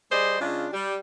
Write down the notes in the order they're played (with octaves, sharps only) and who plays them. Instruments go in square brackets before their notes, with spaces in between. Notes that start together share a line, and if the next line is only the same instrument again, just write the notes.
[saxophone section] G3 G#4 C5 D5 D#5
C#3 G#3 D4 F4
G3